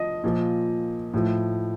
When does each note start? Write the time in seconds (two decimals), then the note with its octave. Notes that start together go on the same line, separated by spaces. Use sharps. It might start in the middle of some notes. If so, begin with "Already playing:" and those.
Already playing: F3 D#5
0.24 A#2 F3
1.14 A2 F3